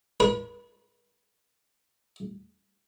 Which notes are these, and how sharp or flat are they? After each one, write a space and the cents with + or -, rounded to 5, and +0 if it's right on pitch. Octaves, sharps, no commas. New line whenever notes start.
B4 -45